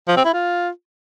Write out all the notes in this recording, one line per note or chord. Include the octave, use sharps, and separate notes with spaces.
F3
C4
E4
F4